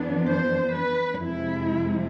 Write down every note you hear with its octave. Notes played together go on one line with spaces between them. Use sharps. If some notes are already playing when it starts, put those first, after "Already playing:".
Already playing: F2 E3 B3 D4
C5
B4
F2 C3 F3 G#3 E4